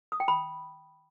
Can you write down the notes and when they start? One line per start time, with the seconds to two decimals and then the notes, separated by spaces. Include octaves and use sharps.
0.12 D#6
0.20 G5
0.28 B5